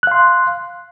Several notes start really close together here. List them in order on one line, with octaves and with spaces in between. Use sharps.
F#6 F5 C6